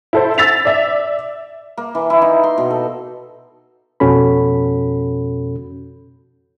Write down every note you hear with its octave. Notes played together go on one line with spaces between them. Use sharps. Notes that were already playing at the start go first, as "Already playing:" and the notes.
E4 A4 C5
E6 A6 B6 F7
D5 E5
A#3
E3
E4
D#4
C6
B2
A4
F2 B2 C#4 F#4 A4 B5